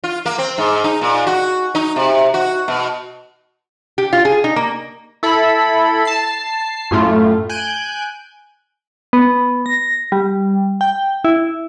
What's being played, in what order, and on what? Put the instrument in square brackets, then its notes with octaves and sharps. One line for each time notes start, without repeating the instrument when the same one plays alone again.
[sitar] F4
A#3
C4
G#2
D#4
A#2
F#4
D#4
C3
F#4
B2
[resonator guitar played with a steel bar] G4
F4
G#4
D#4
A#3
[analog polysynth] E4 A4 B5
A5 C7
F#2 A2 A3 F4
G#5 F#6 G6 D7 D#7
[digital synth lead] B3
A#6
G3
G5
E4